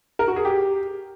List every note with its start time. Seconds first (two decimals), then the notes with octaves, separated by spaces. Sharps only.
0.19 A#4
0.28 F#4
0.36 G#4
0.45 G4